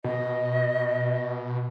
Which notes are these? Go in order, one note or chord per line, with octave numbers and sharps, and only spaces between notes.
B2 D#5